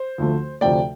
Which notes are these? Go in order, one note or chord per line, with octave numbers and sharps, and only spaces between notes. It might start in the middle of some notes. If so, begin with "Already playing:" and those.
Already playing: C5
D2 D3 F3 A3
D2 C3 F3 A3 D5 G5